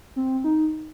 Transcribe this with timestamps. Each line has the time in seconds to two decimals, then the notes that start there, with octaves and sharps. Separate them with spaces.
0.16 C4
0.44 D#4